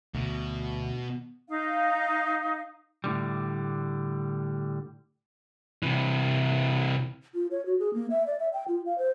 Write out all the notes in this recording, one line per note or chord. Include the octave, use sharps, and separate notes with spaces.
D2 B2
D#4 F5
A2 D3 G3
C3 E3
F4
C#5
F#4
G#4
A#3
E5
D5
E5
G5
F4
F5
C5